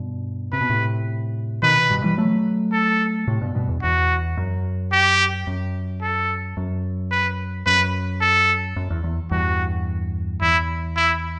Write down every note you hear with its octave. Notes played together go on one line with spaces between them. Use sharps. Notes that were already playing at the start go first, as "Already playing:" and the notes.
Already playing: G2 B2
C3 B4
B2
A2 C3
B2 D#3 B4
G2 B2
E3 G3
F#3 A3
A4
A2 C3
G2 B2
G2 B2
E2
E2 F#4
F#2
G4
F#2
A4
F#2
B4
F#2 B4
A4
F#2
E2
E2
E2 G2 F#4
E2 E4
E4